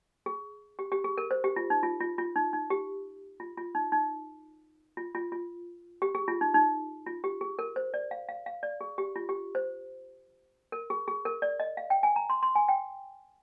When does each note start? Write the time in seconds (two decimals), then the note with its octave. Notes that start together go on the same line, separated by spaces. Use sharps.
0.26 G#4
0.79 G4
0.92 G4
1.04 G#4
1.18 A#4
1.31 C5
1.44 G4
1.56 F4
1.70 D#4
1.83 F4
2.00 F4
2.18 F4
2.36 D#4
2.53 D#4
2.70 G4
3.40 F4
3.57 F4
3.75 D#4
3.92 D#4
4.97 F4
5.15 F4
5.32 F4
6.02 G4
6.15 G#4
6.28 F4
6.41 D#4
6.54 D#4
7.06 F4
7.24 G4
7.41 G#4
7.59 A#4
7.76 C5
7.94 D5
8.11 F5
8.29 F5
8.46 F5
8.63 D5
8.81 G#4
8.98 G4
9.16 F4
9.29 G4
9.55 C5
10.72 A#4
10.90 G#4
11.08 G#4
11.25 A#4
11.42 D5
11.60 D#5
11.77 F5
11.90 G5
12.03 G#5
12.16 A#5
12.30 C6
12.43 C6
12.55 G#5
12.68 G5